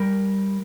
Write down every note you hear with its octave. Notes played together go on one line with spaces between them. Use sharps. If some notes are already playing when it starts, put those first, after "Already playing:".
Already playing: G3 A#4